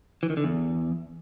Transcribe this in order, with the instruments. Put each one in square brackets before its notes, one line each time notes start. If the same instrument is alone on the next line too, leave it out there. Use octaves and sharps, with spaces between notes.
[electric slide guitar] E3
D#3
D3
E2